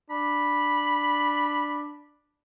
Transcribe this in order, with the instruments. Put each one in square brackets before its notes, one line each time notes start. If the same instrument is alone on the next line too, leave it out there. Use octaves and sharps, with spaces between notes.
[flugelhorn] D4 [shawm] B5